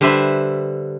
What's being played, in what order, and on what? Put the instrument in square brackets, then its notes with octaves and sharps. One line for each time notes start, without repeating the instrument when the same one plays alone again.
[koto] D3 G3 B4 C5 E5